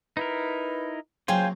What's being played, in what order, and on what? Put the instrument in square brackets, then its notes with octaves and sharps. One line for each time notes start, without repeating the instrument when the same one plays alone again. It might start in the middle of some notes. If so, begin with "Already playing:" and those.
[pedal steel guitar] D#4 E4 A#4 [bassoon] B4
[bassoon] C#3 [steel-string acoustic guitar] F#3 A#3 C4 [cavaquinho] F4 G5 G#5 [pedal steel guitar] C5